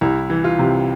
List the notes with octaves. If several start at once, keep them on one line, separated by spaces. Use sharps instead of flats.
C2 E4
E3
F4
C3